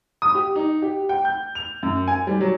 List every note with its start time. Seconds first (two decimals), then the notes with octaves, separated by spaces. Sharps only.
0.22 D#6
0.35 G4
0.56 D#4
0.82 G4
1.09 G5
1.25 G6
1.55 F7
1.83 F#2
2.08 G#5
2.27 G3
2.41 F#3